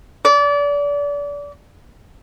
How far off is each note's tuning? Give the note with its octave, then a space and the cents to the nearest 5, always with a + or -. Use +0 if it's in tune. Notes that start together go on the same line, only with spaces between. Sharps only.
D5 -30